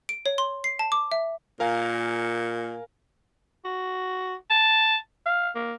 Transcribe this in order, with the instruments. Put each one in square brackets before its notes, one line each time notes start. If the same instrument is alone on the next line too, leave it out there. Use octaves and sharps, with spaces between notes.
[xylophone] D7
C#5
C6
C7
A5
D6
E5
[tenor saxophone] A#2 [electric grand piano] A#4 F5 G#5
[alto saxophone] F#4
A5
F5
A#3